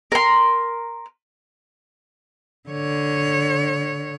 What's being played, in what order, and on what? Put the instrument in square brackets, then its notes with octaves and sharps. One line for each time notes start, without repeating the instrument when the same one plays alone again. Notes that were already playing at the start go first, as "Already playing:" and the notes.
[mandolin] A#4 C6
[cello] D3 C#5